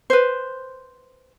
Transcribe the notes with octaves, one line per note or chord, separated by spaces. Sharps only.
B4 C5